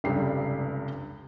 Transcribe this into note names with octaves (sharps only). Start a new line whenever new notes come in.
F1 C#2 G2 G4 C7